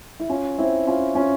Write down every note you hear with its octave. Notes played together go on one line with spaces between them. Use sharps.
E4
C#4 F4
C4 E4
C#4 F4
C#4 F4